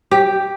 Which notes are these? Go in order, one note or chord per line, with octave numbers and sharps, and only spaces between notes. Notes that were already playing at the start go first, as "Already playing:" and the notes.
G4